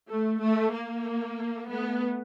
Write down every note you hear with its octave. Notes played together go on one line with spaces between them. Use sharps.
A3
A3
A#3
A3 B3